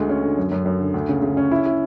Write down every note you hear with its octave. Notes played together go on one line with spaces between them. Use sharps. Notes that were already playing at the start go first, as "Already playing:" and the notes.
Already playing: D2 G#3
C#4
D3
F#2
F#2
F#2
D3
D2
C#3
C#3
C#4
E4
E4